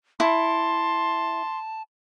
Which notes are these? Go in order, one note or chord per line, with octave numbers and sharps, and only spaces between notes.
E4 A5 C6